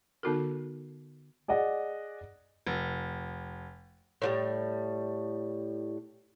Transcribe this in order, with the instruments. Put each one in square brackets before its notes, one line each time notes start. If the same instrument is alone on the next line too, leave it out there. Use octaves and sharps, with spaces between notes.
[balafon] D3 B3 D#4 F#4 A4 A#4
[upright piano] G#4 D5 D#5 F#5
[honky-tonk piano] F1
[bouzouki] A2 F3 G3